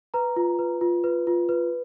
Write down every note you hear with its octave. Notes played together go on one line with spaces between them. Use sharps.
B4 A#5
F4
B4
F4
B4
F4
B4